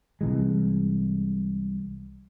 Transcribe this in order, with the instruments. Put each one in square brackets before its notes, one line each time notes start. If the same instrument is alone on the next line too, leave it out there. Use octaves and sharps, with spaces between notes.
[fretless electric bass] C2 E3 G#3